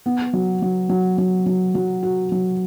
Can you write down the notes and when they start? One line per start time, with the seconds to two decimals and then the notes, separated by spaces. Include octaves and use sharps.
0.06 B3
0.33 F#3
0.62 F#3
0.89 F#3
1.18 F#3
1.46 F#3
1.75 F#3
2.03 F#4
2.32 F#3